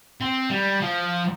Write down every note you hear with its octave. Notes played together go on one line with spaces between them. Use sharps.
C4
G3
F3